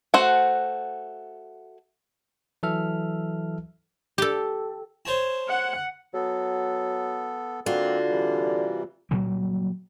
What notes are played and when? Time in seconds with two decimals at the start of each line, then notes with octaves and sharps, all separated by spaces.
0.14 A3 F#4 C5 F#5
2.63 E3 F#3 A4 E5 F6
4.18 G4 A4
5.05 C5 C#5 A5
5.48 F#5
6.14 F#3 B3 A4
7.66 D3 A#3 C4 F4 F#4
8.09 C3 E3 G3
9.11 A#2 F#3 G3 A#3